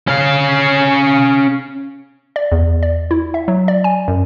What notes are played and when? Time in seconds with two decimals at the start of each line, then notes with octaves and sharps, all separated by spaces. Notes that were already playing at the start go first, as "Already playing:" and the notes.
0.08 C#4 F5
2.36 D5
2.52 E2
2.83 D5
3.11 E4
3.34 E5
3.48 F#3
3.68 D5
3.84 G#5
4.08 F#2